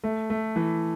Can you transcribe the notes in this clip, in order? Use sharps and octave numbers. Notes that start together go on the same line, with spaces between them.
A3
A3
E3